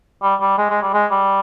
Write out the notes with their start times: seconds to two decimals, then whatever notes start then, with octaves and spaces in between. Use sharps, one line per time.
0.22 G3
0.41 G3
0.58 G#3
0.70 G#3
0.82 G3
0.93 G#3
1.11 G3